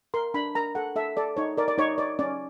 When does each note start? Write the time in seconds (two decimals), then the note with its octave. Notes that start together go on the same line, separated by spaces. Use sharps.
0.14 A#4 C6
0.34 D4 B5
0.55 A#4 A#5
0.75 A4 F#5
0.96 A4 E5
1.17 A4 D5
1.37 D#4 C#5
1.57 A#4 D5
1.68 D5
1.78 D#4 C#5
1.98 C#5 D5
2.19 C#4 D5